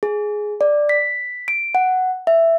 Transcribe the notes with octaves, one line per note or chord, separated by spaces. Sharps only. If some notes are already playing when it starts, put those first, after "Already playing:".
G#4
D5
B6
D7
F#5
E5